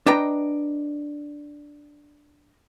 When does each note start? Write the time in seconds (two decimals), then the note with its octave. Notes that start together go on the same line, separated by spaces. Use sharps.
0.06 D4 B4 D#5 G5 A#5